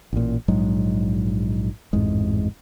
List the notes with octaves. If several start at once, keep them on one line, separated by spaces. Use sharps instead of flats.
A1 A#2
A#1 G#2 F#3 G#3
A1 F2 G#2 G#3